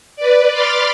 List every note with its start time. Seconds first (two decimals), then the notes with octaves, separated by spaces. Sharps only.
0.16 B4 D5
0.51 B5 C6 D6 F6 A6